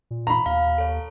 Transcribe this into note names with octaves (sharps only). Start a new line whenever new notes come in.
A#2
A#5 B5
D#2 F5
A4 C#5